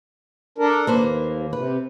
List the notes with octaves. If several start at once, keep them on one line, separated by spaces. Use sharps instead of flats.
D4 A4 A#4
D#2 A#3 B4 C5
C3 B4